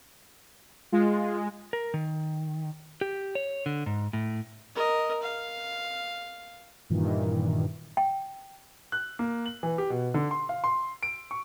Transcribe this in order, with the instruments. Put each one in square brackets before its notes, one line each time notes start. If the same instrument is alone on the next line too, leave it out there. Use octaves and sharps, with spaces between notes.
[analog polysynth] G#3 [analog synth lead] F4
[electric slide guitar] A#4
D#3
G4
C#5
D3
G#2
A2
[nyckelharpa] A#4 D#5
F5
[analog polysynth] G2 A#2 D#3 E3
[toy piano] G5
[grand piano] F#6
A#3
F#7
E3
G4
B2
D3
C6
F5
C6
D7
C#6